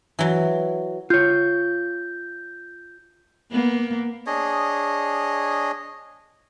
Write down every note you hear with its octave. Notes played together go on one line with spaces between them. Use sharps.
E3 F#3
F4 C#5 G6
A#3 B3
D4 G#4 C#5 D#5